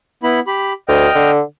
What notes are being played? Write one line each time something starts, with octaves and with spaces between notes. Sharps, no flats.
B3 E4 B5
G4 B5
D2 D#5 G5 F6
D3